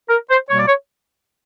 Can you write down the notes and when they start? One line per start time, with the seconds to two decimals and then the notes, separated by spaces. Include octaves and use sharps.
0.09 A#4
0.30 C5
0.49 B2 G3 A#3 C#5
0.59 D5
0.67 C#5